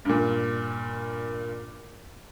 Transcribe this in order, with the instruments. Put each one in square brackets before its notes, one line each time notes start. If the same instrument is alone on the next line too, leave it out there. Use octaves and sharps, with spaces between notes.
[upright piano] G2 A#2